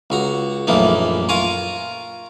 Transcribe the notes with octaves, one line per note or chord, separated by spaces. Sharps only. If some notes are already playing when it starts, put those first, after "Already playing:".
C#2 F#4 A#5
A#1 F#2 A2 E3 A#3 D#4
F4 A#4 F5 G#5 A#5 C#6